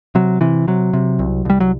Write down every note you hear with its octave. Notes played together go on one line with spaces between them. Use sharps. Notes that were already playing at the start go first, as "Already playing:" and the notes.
C3 F#3
C3 E3
C3 F#3
C3
C2
C2 G3
F#3